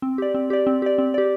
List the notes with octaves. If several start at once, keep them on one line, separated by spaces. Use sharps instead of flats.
C4
G4 D5
C4
G4 D5
C4
G4 D5
C4
G4 D5